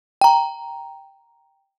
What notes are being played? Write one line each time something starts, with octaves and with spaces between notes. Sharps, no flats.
G5 A#5